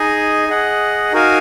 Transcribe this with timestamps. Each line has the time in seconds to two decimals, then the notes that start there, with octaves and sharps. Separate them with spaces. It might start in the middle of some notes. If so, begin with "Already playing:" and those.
Already playing: D#4 G#4 D#5 G#5
0.48 G#4 D#5 F#5
1.12 D#4 F#4 A#4 F5 G#5